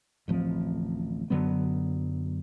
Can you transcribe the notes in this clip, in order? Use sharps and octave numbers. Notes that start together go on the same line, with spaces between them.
D1 A1 F3 C4
F#2 D3 F#3 B3